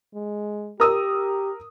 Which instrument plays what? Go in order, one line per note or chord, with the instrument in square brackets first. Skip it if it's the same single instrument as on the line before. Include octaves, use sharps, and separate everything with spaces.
[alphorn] G#3
[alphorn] G4 [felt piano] A#4 D#6 E6